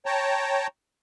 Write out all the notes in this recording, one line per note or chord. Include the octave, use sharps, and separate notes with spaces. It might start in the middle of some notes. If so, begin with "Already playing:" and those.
C#5 G5 A5 A#5